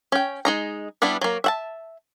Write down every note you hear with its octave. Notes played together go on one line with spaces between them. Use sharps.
C#4 G5
G#3 D#4 A#5
G3 B3 D4 E4
F#3 A#3
E5 F#5 A5